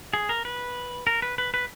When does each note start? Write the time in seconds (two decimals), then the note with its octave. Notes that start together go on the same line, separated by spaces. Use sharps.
0.13 G#4
0.29 A#4
0.45 B4
1.07 A#4
1.22 B4
1.38 B4
1.54 B4